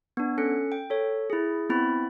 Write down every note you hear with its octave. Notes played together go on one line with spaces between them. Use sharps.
B3 D4
C#4 A4 C#7
G5
A4 C#5
E4 G#4
B3 C4 E4 B5